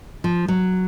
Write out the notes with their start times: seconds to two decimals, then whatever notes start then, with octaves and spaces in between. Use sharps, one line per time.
0.24 F3
0.48 F#3